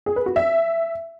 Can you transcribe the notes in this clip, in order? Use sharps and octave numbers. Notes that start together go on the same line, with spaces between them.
G#4
B4
F#4
E5